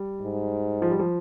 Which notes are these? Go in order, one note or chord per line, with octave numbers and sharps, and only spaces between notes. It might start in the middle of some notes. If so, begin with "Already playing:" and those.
Already playing: G3
G#2
F3
G3
F3